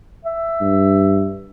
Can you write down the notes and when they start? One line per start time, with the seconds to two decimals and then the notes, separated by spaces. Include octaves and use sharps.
0.25 E5
0.61 G2